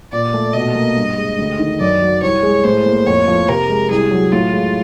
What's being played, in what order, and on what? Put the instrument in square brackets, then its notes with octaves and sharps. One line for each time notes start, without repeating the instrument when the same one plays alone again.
[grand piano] A#2 [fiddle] D5
[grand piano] A3
[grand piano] B2 [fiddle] D#5
[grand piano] A#3
G2
G#3
D2
D#3
[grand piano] F#2 [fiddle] D5
[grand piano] F#3
[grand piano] C2 [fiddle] C#5
[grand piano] G#3
[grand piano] A2 [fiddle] C5
[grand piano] A#3
[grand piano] F2 [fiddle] C#5
[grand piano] F3
[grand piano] C3 [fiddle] A#4
[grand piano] G#3
[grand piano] C2 [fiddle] G#4
[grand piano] F#3
[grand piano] A2 [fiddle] F4
[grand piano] G#3